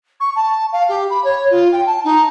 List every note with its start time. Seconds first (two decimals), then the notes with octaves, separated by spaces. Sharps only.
0.20 C#6
0.36 A5
0.72 F5
0.89 G4
1.10 B5
1.24 C#5
1.50 F4
1.72 G5
1.86 A5
2.04 D#4